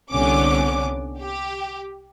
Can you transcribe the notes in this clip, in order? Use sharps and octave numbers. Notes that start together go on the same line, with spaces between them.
C2 D3 B3 C#4 D6
G4